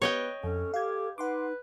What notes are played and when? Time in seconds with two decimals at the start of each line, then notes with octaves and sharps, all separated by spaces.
0.02 B3 G4 B4 C#5 D#5 G5
0.44 F2 C#4 A4
0.74 G4 F5 G#6
1.18 D#4 B4 F#5 C6 D6